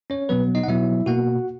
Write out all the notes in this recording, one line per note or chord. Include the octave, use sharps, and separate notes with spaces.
C#4 C#5
B2 F#3 B3 B4
D#4 D#5
F#5
B2 F#3 B3 E4 E5
B2 A#3 F#4 F#5